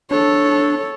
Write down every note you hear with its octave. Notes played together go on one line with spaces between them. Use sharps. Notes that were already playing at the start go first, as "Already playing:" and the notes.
D4 A4 C#5